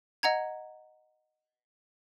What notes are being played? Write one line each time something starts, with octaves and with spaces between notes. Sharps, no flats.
D#5 F#5 A#5 G#6